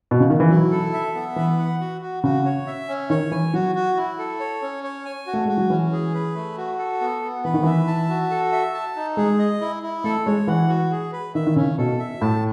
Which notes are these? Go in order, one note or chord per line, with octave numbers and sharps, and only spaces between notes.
B2
C#3
D#3
E3
F#3 E4
A4
E5
B3
E3 B4
F#5
F#4
F#4
C#3 F#4
C#5
E5
C#4
D#3 C#5
E3 G#5
F#3 F#4
F#4
E4
A4
C#5
C#4
C#5
G#5
F#4
A3
G#3 F#4
F#3
E3 C#4
G#4
B4
A3
F#4
A4
B3
B3
E3 B4
D#3
E3 E5
A5
F#4
A4
E5
A5
D#4
G#3 G#4
D#5
E4
E4
A3 A4
G#3 C#5
E3 F#5
F#4
G#4
B4
D#3 E5
D#3
C#3 C#4
B2 A4
E5
A2 A5